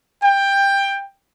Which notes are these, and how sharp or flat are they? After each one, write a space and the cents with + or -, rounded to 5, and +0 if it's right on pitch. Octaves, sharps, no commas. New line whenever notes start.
G5 +15